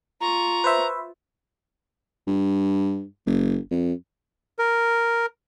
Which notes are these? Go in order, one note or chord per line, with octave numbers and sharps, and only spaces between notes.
F4 A#5 C#6
B4 C5 E5
G2
F#1
F2
A#4